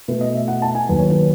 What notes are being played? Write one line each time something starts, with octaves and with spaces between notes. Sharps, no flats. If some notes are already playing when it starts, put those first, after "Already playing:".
B2 A3 B4
D#5
E5
F#5
A5
G#5
D#2 D#3 F#3 B4
C#5
B4